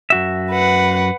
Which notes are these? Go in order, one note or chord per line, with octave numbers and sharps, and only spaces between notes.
F#2 F#4 E5
B4 F#5